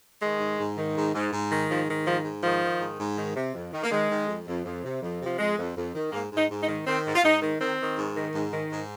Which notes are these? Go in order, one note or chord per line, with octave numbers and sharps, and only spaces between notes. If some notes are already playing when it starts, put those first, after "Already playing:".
D#3 G#3
G#2
G#2
D#3
G#2
G#2
G#2
D#3
G#2 F3
D#3
G#2 F3
G#2
D#3 F3
D#3
G#2
G#2
D#3
C3
F2
D#3
A#3
D#3 G#3
D#3
F2
F2
F2
C3
F2
C3
F3
F2 G#3
F2
F2
D#3
G#2 A#3
G#2
D#4
G#2
D#4
D#3
D#3 C4
G#2
F4
G#2 D#4
D#3
D#3 C4
D#3
G#2
D#3
G#2
D#3
G#2